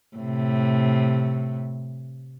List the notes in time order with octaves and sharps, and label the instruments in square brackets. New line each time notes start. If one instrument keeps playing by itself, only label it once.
[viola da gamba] A2 C3